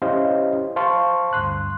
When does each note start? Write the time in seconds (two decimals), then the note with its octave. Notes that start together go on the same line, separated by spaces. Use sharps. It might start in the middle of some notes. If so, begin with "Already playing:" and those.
0.02 C#4 E4 G4 C5 D#5 F5
0.76 C5 F5 A5 C6 C#6
1.33 D2 G2 C6 F#6